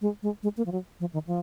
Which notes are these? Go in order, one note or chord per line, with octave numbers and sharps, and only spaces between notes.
G#3
G#3
G#3
A#3
F3
F#3
F3
D#3
F3